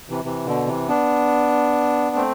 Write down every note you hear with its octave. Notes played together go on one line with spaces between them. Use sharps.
C3 E3
C3 E3
B2 D3
C3 E3
B3 D4
A3 C4